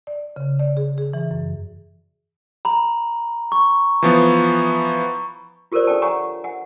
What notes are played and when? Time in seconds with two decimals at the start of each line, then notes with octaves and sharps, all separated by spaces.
0.07 D5
0.36 C#3
0.59 D5
0.77 G#4
0.98 G#4
1.13 E3
1.31 F#2
2.65 A#5 B5
3.52 C#6
4.03 E3 F3 B3
5.72 F4 G4 A4 A#4 C5 D5
5.87 D4 A4 D5 G5 A5
6.02 C#5 F#5 G#5 A#5 C#6
6.44 F#5 G#5